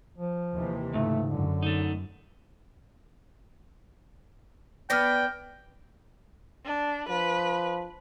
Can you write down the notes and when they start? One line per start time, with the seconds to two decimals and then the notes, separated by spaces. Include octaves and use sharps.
0.18 F3
0.53 D#2 C3 E3
0.93 C#2 G#2 A3
1.28 F#2 D3
1.62 A3 D#4
4.90 B3 D4 D5 G5 F6 A#6
6.65 D4
7.09 F3 B4